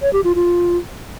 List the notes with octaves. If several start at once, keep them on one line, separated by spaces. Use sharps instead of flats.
C#5
G4
F4
F4